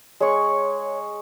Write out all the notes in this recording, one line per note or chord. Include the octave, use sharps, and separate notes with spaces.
G#3 C#5 C#6